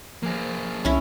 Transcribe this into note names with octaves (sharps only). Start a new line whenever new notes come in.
F3 A#3 G#4
C2 C#4 E4